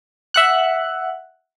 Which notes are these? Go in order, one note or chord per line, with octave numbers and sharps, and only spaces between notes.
E5 F#5 F#6